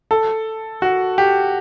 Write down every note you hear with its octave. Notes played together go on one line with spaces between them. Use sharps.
A4
F#4
G4